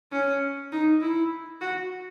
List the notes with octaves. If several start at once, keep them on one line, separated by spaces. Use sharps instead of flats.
C#4
D#4
E4
F#4